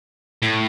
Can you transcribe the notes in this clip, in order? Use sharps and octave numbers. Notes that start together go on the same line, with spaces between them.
A2